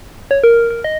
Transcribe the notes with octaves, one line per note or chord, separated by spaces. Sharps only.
C#5
A#4
A#4
D#5